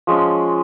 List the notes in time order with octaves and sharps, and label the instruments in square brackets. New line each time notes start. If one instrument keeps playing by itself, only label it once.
[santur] F3 G#3 C#4